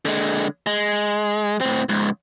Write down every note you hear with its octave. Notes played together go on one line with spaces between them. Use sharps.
D3 G#3
G#3
A2 C4
C#2 G#2